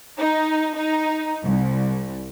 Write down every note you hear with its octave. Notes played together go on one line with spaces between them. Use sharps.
D#4
D#4
C2